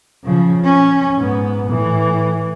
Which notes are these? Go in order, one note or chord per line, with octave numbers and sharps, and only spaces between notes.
C#3 F3
C#4
G#2 B3
A2 E3